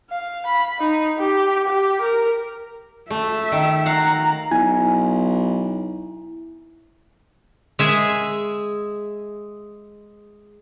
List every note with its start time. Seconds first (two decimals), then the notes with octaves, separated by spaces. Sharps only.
0.10 F5
0.46 B5
0.80 D#4
1.19 G4
1.67 G4
2.01 A#4
3.11 A3 E5
3.52 D#3
3.86 F5 F#5 A#5
4.51 B1 E4 G#5
7.79 G#3 E5 G#5